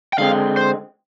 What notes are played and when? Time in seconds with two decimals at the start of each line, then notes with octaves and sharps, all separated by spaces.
0.13 G5
0.18 D3 G#3 C4 F5
0.57 C5